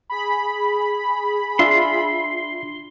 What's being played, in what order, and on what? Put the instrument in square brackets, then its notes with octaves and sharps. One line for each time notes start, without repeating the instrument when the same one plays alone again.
[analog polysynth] G#4 B5
[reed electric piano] D4 F4 E5 [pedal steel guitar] C6